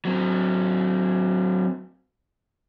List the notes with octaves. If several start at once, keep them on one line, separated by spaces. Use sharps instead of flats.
F#3 C4